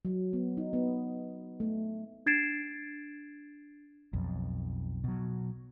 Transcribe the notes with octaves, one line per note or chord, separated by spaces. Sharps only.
F#3
B3
D#4
B3
A3
D4 G#6 A6 C7 D7 E7
B1 F2
B2 F#3